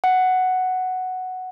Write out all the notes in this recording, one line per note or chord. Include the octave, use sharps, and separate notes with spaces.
F#5